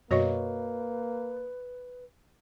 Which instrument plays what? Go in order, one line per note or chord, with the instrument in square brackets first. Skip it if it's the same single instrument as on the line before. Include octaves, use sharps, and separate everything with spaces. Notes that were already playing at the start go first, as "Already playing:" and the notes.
[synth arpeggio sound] F#2 B2 C#6 [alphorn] A#3 [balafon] F#4 C#5 D#5 [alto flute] B4